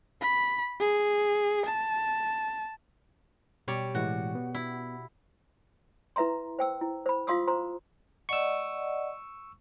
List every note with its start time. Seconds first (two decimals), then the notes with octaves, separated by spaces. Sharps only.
0.22 B5
0.80 G#4
1.66 A5
3.68 B2 G3 G4 C#5 D5
3.95 A2 E3 G#3 F#4
4.35 B3
4.54 E4
6.16 E4 B4 E5 A#5 C6
6.59 C5 G5 E6
6.81 E4
7.06 C5 B5
7.27 F4 F5 C6 D#6 E6
7.48 C5 A#5 C6
8.29 D5 D#5 F#5 C#6 E6